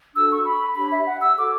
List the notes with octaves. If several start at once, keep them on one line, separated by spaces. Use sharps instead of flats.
D4 F#4 A4 E6
C#6
B5
D4 G4 C#5 B5
E5
F#5
E6
F#4 A4 C#5 D6